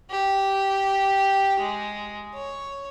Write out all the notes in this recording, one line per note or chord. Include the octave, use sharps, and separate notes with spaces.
G4
G#3
C#5